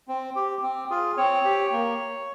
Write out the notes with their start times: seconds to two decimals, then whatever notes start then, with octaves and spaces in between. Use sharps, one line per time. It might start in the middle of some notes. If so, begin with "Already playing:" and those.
0.08 C4
0.36 G4
0.63 C4
0.90 F4 G#4
1.17 C4 C#5
1.45 G4
1.72 A#3